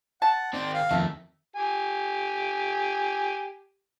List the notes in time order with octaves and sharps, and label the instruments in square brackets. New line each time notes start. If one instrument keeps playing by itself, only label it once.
[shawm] F#5 [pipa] A5
[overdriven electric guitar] D#3 C4 [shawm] D5
[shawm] F5
[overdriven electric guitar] F2 D#3 [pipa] A3
[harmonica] G4 G#5